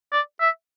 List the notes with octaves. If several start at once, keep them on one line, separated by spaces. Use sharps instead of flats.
D5
E5